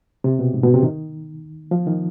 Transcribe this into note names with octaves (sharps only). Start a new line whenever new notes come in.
C3
B2
G#2
B2
C3
D#3
F3
D#3